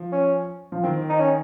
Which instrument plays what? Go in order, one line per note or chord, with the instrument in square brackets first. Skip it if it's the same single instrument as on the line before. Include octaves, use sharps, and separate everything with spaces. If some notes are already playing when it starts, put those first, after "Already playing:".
Already playing: [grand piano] F3
[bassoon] C#4
[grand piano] F3
[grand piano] D#3 [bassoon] C4
[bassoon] D#4
C#4